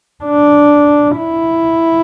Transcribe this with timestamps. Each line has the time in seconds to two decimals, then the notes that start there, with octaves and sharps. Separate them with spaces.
0.24 D4
1.17 E4